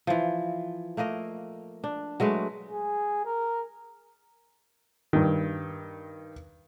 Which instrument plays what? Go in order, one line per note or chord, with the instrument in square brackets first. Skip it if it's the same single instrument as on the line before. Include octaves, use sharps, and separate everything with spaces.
[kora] E3 F3
A3 A#3 A#4 D#5
D4
F#3 G#3 A3 B4
[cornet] G#4
A#4
[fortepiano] G2 D#3